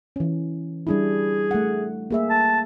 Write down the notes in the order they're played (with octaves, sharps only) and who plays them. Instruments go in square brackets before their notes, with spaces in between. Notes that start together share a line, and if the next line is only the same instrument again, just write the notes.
[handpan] E3 C#4
[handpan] G3 D4 E4 [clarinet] G#4
[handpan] A3 F#5
A#3 G#4 E5
[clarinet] A5